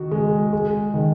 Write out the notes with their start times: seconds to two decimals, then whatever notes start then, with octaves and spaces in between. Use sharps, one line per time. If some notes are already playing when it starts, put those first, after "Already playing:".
Already playing: D#3 F#4
0.11 G#3
0.53 G#3
0.94 D#3